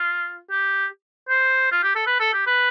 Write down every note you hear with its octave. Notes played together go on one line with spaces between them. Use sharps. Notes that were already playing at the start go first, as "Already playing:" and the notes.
Already playing: F4
G4
C5
F4
G4
A4
B4
A4
G4
B4